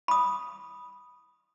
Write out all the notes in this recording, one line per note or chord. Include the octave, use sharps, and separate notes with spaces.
B5 D#6